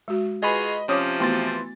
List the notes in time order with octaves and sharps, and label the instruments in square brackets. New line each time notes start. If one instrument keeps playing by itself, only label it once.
[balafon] G#3 F#4
[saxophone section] F4 F#4 G#4 [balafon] B4 G#5 [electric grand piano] D#5 B5
[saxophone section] C3 F3 [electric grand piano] C#4 D#6 [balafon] C#5 D6
[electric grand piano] E3 C6 A6 [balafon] A3 B3 F#4